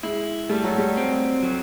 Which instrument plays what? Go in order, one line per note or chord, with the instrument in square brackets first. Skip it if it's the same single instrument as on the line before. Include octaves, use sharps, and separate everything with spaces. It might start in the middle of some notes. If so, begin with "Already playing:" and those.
[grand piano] G#3 [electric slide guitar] E4
[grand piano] G3 [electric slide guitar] A3
[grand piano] F#3
G3
[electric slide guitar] C4
F#3